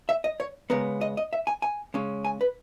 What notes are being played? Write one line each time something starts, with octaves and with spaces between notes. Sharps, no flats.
E5
D#5
C#5
C#3 G#3 B3 A#4
D#5
D#5
E5
G#5
G#5
C#3 G#3 C#4
G#5
B4